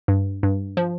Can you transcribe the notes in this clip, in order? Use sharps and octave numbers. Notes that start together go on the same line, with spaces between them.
G2
G2
F3